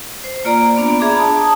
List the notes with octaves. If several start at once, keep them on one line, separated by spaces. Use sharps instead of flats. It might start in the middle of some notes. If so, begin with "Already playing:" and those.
C5
A#3 F4 D5 A#5
B3 D4 D5
D4 G#4 E5 A#5 B5 D6
A5 D#6